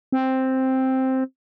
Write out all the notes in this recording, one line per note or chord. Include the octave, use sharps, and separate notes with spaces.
C4